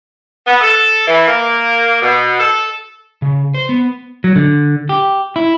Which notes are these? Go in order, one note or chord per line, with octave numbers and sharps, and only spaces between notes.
B3
A4
E3
A#3
B2
A4
C#3
C5
B3
F#3
D3
G4
E4